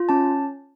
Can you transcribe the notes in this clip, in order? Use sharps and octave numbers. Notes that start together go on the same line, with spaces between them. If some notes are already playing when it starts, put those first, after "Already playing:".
Already playing: F4
C#4 A5